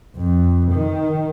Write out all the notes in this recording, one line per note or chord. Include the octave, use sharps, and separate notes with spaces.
F2
D#3